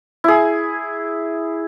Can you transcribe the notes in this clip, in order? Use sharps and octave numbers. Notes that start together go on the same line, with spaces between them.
E4 G#4